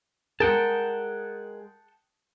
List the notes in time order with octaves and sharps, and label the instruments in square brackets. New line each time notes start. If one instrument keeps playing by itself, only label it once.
[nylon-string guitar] G#3 A#4 [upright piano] G#4 [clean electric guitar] F#5 G5 A5